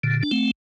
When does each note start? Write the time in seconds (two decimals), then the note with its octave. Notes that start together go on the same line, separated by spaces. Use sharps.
0.04 A#2 D3
0.23 D4
0.31 A3 C4